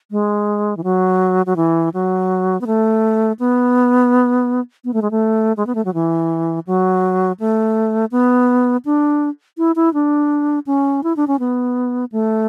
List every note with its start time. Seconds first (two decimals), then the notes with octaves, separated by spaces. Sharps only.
0.11 G#3
0.77 E3
0.84 F#3
1.46 F#3
1.56 E3
1.94 F#3
2.61 B3
2.67 A3
3.39 B3
4.85 B3
4.94 A3
5.02 G#3
5.11 A3
5.57 G#3
5.67 B3
5.75 A3
5.85 F#3
5.94 E3
6.67 F#3
7.40 A3
8.11 B3
8.85 D4
9.58 E4
9.76 E4
9.94 D4
10.67 C#4
11.03 E4
11.17 D4
11.28 C#4
11.39 B3
12.12 A3